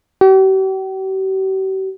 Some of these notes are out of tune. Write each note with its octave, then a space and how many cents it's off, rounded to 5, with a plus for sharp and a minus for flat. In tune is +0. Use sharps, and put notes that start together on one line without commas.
G4 -45